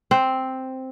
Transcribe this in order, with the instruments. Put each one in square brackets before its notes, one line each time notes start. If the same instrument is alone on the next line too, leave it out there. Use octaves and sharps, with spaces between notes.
[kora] C4